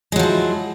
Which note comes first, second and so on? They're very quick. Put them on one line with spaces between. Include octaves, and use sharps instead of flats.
G#3 F#3 F3 E4